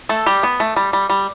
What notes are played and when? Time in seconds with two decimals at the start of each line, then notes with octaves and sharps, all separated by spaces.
0.09 A3 A4
0.26 G3 G4
0.43 B3
0.60 A3
0.76 G3
0.93 G3
1.09 G3